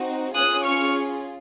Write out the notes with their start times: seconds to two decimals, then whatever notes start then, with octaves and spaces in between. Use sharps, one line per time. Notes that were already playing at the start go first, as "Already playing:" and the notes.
Already playing: C4 D#4 F#4
0.35 C#4 F4 G#4 D#6 F#6
0.65 C#6 F6